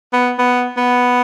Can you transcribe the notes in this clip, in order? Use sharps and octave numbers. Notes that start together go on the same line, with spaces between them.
B3
B3
B3